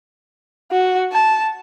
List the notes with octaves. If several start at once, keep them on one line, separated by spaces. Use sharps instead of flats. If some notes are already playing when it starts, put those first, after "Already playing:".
F#4
A5